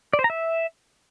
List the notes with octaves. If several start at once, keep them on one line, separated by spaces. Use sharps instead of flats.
D5
C5
A#5
E5